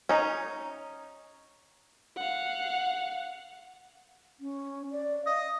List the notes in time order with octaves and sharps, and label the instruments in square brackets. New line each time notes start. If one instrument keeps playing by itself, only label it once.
[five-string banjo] C#4 D#4
[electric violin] F5 F#5
[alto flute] C#4
D5
[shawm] D#5 [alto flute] F5